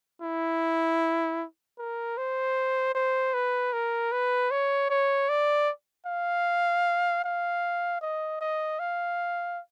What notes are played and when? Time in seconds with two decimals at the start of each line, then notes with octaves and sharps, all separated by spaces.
0.22 E4
1.79 A#4
2.17 C5
2.95 C5
3.34 B4
3.73 A#4
4.12 B4
4.51 C#5
4.90 C#5
5.29 D5
6.06 F5
7.24 F5
8.01 D#5
8.41 D#5
8.80 F5